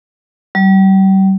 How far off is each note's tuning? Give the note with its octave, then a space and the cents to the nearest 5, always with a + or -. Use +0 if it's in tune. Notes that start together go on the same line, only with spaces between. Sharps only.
G3 -35